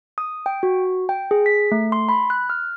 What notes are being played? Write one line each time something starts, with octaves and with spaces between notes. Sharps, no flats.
D#6
G5
F#4
G5
G#4
B6
A3
C6
B5
F#6
F6